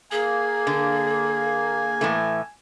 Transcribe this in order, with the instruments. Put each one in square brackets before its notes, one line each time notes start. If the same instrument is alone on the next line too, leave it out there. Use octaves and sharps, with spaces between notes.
[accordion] A#3 [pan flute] G#4 [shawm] G#5
[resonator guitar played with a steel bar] D3
A2 E3 A3